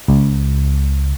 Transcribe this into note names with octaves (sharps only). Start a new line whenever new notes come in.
C#2